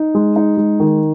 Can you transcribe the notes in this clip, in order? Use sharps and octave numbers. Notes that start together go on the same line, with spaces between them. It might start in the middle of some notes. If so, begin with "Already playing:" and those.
Already playing: D#4
G#3
D#4
G#3
D#3